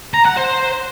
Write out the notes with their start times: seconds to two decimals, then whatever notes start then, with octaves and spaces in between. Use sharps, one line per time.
0.14 A#5
0.25 F#5
0.37 C5